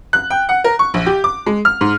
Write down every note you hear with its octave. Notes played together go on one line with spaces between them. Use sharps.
F#6
G5
F#5
A#4
C#6
A#1
G4
D6
G#3
F6
G#2